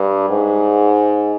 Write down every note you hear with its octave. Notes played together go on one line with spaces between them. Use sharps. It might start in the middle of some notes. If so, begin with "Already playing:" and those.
Already playing: G2
G#2